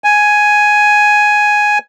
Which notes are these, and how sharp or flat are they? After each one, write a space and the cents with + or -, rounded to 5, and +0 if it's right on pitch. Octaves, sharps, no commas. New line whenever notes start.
G#5 +5